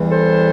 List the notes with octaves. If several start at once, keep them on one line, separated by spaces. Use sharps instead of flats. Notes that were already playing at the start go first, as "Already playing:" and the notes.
Already playing: E2 E3 G3
A4 C5